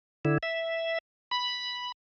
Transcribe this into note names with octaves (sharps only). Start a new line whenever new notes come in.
D3 E4
E5
B5